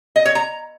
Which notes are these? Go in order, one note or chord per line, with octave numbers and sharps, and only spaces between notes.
D#5
C#5
A#5